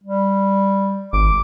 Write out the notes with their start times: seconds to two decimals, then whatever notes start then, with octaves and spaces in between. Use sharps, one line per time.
0.04 G3
1.13 G#1 D6